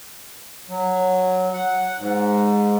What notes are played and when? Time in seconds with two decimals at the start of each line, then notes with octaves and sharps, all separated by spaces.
0.69 F#3
1.54 F#5
1.99 G#2